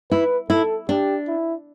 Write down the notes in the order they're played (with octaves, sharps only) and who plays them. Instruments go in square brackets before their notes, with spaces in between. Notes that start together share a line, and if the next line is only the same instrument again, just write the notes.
[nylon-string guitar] E4 [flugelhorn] B4
[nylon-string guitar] E4 [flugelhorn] A4
[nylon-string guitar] D4 [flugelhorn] G4
[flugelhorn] E4